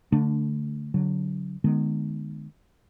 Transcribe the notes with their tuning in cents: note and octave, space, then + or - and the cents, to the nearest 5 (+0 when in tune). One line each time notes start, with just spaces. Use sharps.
D3 -15 A3 +0 D4 +0
D3 -30 F#3 +0
D#3 -35 G#3 +25 B3 +0